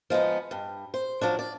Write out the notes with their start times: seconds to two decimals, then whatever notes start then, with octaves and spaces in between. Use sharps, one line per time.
0.10 F3 G#3 B3 D#4
0.51 G2
0.94 C5
1.21 F3 F#3 D4
1.39 D5